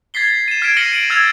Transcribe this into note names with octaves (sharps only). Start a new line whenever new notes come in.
G#6 A6 B6 C7 G7
D#7 E7
F6 G#6 B6 C7 D7 E7
F6 A#6 C#7 D#7 F#7 G7
D7 D#7 F#7
E6 F6 G#6 A6 F7